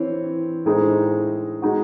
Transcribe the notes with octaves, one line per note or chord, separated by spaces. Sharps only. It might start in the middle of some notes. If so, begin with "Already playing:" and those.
Already playing: E3 C4 C#5
A2 G#3 D#4 G#4 C5
G#3 D#4 F#4